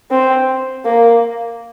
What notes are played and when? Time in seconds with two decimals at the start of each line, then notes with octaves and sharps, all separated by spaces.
0.11 C4
0.85 A#3